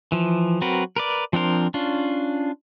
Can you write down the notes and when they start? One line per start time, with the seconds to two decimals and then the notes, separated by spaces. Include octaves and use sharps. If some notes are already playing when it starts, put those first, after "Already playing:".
0.12 E3 F3
0.61 F#3 C4 F#4 A#4 B4
0.96 A#4 B4 D5
1.33 F3 C4 D4 A#4 C5
1.74 C#4 D4 F4